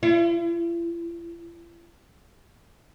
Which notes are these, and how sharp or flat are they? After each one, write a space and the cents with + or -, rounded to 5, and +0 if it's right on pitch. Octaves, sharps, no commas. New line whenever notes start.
E4 +45